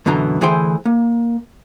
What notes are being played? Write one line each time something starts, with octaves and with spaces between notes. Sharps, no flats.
F#2 B2 D3 E3 A#5
D2 E3 E4 G#4 C5 G5
A#3